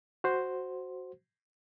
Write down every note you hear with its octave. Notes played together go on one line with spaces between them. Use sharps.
F#4 C5